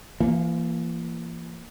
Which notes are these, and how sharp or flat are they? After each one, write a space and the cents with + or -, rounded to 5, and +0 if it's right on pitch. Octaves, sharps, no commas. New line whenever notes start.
E3 +40 A#3 +0